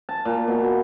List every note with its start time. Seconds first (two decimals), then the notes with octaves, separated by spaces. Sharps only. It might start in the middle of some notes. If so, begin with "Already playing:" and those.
0.09 A5
0.25 A#2
0.48 B2